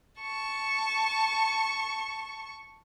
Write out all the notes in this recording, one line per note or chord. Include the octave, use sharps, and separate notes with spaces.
A5 C#6